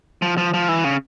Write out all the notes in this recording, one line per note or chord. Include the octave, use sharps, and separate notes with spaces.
F3
F3
F3
E3
C#3